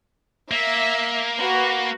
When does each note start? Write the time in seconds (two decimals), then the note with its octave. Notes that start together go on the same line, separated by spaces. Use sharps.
0.51 A#3 E5
1.38 F#4 B4